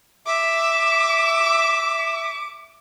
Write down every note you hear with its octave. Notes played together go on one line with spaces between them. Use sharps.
E5 D6